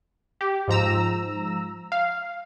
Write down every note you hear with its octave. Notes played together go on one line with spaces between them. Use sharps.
G4
G#2 F3 A#5 E6
F5